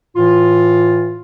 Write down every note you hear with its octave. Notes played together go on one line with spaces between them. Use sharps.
A2 E3 F4